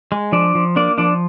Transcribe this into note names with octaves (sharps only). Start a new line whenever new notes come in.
G#3
F3 D4 D5
F3
A#3 D4 D5
F3 D4 D5